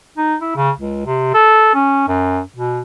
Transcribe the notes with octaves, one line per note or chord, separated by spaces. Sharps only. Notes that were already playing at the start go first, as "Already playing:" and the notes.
D#4
E4
C#3
C#2
C3
A4
C#4
F#2
B2